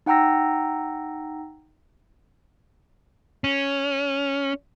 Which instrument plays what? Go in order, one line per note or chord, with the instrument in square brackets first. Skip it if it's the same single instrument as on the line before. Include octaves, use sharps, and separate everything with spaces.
[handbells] D#4 F#5 G5 A#5 E6 A#6
[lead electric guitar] C#4